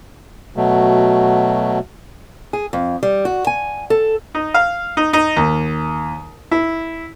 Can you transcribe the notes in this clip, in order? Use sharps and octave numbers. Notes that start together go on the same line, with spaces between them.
B2 F#3 A3
G#4
F2
G3
F#4
G#5
A4
D#4
F5
D#4
D#4
D#2
E4